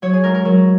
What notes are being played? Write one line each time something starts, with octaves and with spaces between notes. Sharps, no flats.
F#3 C#5
G#4
G#2 A#4
A#4
F#3